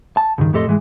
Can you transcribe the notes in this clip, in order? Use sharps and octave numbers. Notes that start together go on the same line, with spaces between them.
A5
C#2 G2 D#3
F2 A2 G4 A4 D#5 C6
G#2 E3 G#3